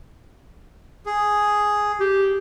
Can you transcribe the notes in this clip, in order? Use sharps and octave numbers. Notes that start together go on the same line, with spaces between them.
G#4
G4